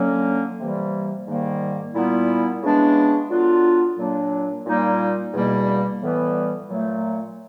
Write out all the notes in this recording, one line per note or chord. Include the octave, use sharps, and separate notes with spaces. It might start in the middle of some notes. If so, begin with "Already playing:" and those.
Already playing: D3 F#3 A#3 C#4
C3 E3 G3 A#3
G#2 D#3 G3 A#3
A#2 G3 B3 E4
C#3 E3 G#3 B3 D4
D3 F#3 B3 D4 F4
A#2 F#3 A#3 D4
A#2 G3 A#3 D#4
E2 B2 G3 A#3
A2 E3 G3 B3
A#2 F#3 A3